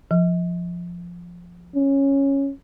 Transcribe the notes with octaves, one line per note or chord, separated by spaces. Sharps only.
F3
C#4